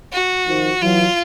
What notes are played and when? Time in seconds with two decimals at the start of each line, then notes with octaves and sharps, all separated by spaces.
0.13 F#4
0.47 D#3 F3
0.82 E3 F#3 F4